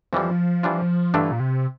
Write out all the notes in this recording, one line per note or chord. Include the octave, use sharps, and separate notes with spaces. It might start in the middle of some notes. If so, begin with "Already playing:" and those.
F2 E3 F3 G3
E3 G3 D4 F4
G2 D3 E3 A3 D4
A#2
C3